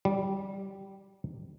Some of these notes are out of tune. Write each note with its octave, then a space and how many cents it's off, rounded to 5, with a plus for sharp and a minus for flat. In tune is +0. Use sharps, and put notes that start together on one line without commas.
G3 -10